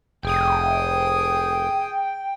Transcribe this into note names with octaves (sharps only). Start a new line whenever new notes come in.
F1 G#4 G5 D#6